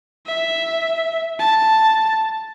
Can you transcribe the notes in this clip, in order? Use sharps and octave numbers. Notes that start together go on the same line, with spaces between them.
E5
A5